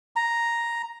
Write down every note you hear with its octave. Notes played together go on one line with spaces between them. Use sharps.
A#5